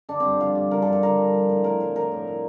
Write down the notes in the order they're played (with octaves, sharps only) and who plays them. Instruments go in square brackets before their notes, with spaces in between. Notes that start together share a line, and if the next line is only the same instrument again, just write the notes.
[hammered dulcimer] D3 D4
C4
G2
F3 F4
G2
D3 A#4
G2 A4
A4
D3 A#4
G2
F3
A2
A2 A#4
A2 C5
A2 A#4
A2
A2